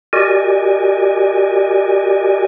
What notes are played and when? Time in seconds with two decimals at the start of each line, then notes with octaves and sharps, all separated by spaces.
0.13 F#4 G4 A#4 D5 D#5 G#5